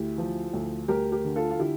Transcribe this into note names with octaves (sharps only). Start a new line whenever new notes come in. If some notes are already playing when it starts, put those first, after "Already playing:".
Already playing: D2 E4 G4
F3
D2
D2 G4 A#4
G4 A#4
D3
F4 A4
F4
D3 E4 G4